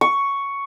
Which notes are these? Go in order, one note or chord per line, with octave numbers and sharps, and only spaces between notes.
C#6